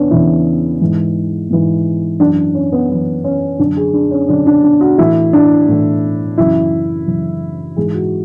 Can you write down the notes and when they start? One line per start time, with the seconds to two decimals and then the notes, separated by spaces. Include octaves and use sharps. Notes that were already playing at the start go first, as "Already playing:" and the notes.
Already playing: E2 C#3 E3 B3 C#4 D4
0.11 E2 C#3 E3 E4
0.80 G#2 E3
1.50 G#2 E3
2.20 F#2 E3 D4
2.55 C#4
2.72 B3
2.89 F#2 E3 B3
3.24 C#4
3.59 D3 D4
3.63 F#2
3.77 G#4
3.94 D4
4.11 C#4
4.29 F#2 D3 D4
4.47 D4
4.64 D4
4.81 F#4
4.98 A2 E3 E4
5.33 D4
5.68 A2 E3
6.38 F#2 C#3 E3 E4
7.07 F#2 C#3 E3
7.76 G#2 E3 G#4
7.94 F#4